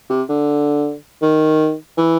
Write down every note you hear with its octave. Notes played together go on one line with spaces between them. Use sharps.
C3
D3
D#3
E3